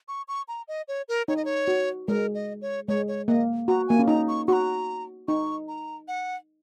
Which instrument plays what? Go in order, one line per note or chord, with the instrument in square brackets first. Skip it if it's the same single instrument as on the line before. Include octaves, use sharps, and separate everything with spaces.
[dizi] C#6
C#6
A#5
D#5
C#5
A#4
[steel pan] D#4 [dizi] C#5
[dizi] D#5
C#5
[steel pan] F#4
[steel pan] G#3 [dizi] A#4
[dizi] D#5
C#5
[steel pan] G#3 [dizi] C#5
[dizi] C#5
[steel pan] A#3 [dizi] D#5
[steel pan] F#4 [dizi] A#5
[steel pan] A#3 [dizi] G#5
[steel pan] C#4
[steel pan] D#4 [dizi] A#5
[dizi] C#6
[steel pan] F#4 [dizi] A#5 C#6
[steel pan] D#4 [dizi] C#6
[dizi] A#5
F#5